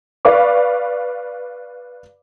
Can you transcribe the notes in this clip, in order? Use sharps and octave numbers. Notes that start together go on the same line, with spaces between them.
B4 D5 F5 C#6 D6